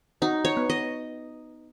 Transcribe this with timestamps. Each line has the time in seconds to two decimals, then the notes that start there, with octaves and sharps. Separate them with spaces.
0.22 D#4 F#4
0.45 C#5
0.57 B3
0.70 D#5